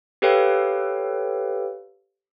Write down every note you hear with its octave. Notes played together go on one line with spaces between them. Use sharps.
G4 A4 B4 C#5 F5 G5